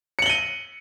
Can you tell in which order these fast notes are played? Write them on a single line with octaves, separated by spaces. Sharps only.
C#7 F#7 G7 D#7